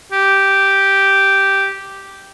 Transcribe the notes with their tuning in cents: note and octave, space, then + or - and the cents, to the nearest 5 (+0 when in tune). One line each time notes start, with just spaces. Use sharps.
G4 -5